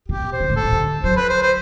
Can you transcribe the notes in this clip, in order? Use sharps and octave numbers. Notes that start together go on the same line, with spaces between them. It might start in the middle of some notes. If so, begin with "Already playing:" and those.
B2 G4
C5
D3
A2
B2 A4
C3
D3
F#3 C5
B4
C5
C5